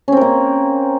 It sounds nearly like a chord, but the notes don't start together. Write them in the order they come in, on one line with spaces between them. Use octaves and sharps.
C#4 C4 A#4 A#3